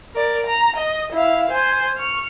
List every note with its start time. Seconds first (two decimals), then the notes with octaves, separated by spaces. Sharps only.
0.14 A#4 D5
0.47 A#5
0.76 D#5
1.12 E4 F5
1.51 C5 G#5
1.97 C#6 F6